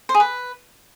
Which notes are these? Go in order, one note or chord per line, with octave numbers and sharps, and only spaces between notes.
C5
G#4
B4